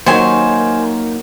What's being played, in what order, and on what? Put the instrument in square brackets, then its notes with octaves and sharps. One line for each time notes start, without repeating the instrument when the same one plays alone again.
[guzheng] F#3 [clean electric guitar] A#3 D#4 [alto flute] A#4 [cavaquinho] C5 G#5